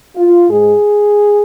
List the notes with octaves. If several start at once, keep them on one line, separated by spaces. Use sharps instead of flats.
F4
G#2 G#3 G#4